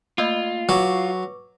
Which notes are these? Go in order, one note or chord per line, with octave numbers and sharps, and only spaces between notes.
A3 A#3 F4 D#5
F#3 B4 C#6 D6